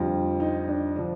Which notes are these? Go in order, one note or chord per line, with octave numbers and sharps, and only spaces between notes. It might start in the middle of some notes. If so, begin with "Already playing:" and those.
Already playing: F2 D3 G3 F4
D#4
D4
D3 F3 D4